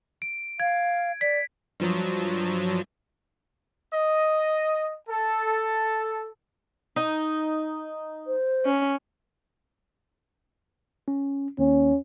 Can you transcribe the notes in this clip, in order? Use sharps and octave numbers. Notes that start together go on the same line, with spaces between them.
D7
F5 G#6
D5 B6
G2 F3 F#3
D#5
A4
D#4
C5
C#4
C#4
D#2 C#4